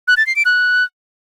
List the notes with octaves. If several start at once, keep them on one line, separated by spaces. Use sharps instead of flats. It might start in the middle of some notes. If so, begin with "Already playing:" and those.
F#6
A6
C7
D7
F#6